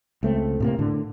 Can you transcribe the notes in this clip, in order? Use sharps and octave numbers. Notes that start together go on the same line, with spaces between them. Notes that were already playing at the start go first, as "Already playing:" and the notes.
C#2 A3 C4
A2 C3 A#3
A2 D3